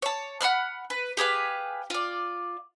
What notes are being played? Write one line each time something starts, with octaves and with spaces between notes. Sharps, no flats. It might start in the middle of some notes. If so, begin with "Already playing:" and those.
C#5 A5
F#5 B5 F6 F#6
B4
G4 G#4 B4 F5
F4 D5